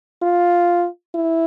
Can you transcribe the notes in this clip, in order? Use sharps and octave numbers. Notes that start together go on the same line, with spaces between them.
F4
E4